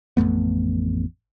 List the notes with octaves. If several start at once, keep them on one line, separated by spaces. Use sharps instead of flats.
A1 F2 A3 B3